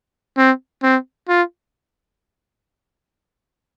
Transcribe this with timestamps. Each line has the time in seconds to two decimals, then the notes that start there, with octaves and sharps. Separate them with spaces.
0.37 C4
0.83 C4
1.28 F4